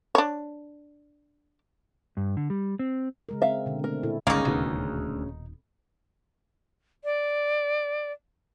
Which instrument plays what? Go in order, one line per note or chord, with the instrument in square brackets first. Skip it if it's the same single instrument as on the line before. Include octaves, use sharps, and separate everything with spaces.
[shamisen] D4 C#5
[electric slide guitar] G2
D3
G3
C4
[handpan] C#3 G#3 A#4
[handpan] C4 [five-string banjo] E5 F5
[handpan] B2 D3
[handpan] A3 C4 [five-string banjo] A#4
[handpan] A#2 E4 A4
[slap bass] G1 C#2 [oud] C#3 [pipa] A#3 D#4
[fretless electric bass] D#1 B2 D#3 [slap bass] D2
[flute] D5